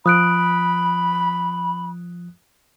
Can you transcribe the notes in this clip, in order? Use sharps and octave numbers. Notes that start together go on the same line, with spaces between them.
F3 B5 D#6 F#6 D7